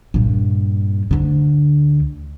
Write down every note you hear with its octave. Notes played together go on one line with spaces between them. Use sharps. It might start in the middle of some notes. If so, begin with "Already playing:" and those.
G2 A#2
D2 D3